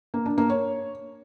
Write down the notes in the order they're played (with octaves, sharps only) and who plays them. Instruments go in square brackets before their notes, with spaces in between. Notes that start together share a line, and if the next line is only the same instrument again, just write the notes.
[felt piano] A#3
D4
A#3
C#5